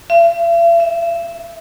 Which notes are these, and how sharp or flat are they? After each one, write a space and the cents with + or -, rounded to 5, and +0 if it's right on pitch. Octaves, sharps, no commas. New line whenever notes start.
E5 +45
E5 -10